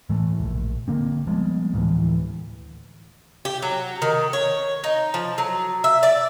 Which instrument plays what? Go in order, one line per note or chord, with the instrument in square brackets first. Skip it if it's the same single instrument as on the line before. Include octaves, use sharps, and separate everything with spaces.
[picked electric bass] A2 E3 A3
E1 A#1
D3 A#3 C4
F3 G3 G#3 B3
D2 A2 E3
[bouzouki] G4
F#3
D#3
C#5
D#4
F3
F#3
E5
D5